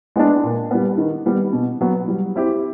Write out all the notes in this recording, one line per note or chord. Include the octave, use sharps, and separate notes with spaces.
G#3 B3 D4
A#2
G3 B3
D#3
G3 B3
B2
F#3 B3
G3
C4 E4 G4